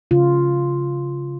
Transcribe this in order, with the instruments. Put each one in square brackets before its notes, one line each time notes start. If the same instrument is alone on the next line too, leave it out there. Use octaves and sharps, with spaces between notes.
[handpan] C#3 F4